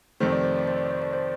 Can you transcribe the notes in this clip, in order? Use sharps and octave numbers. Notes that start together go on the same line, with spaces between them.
F2 C3 D#3 A3 C5
D5
C5
D5
C5
D5
C5
D5
C5